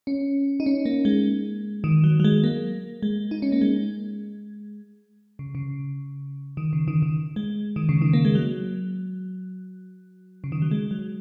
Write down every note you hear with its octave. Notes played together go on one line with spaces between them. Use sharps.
C#4
D#4
C#4
A#3
G#3
D#3
F#3
F#3
G#3
A#3
G#3
D#4
C#4
A#3
G#3
C#3
C#3
D#3
C#3
D#3
D#3
G#3
D#3
C#3
D#3
A#3
G#3
F#3
C#3
D#3
F#3
G#3
F#3